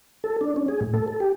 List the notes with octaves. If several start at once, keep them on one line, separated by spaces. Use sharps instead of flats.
A4
D4
C#4
G#4
A2
A4
A4
G4